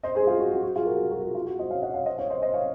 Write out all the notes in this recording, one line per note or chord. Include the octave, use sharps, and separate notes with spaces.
C5 D#5
G#4 C5
F4 G#4
F#4
F#4
F#4
F4 G#4
F#4 A#4
F#4 A#4
F4 G#4
F4
F#4
C5 D#5
C#5 F5
D#5 F#5
C#5 F5
C5 D#5
C#5 F5
C5 D#5
C5 D#5
C#5 F5